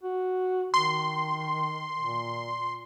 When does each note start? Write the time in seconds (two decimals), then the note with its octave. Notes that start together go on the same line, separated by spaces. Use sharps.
0.03 F#4
0.74 D#3 C6
2.01 A#2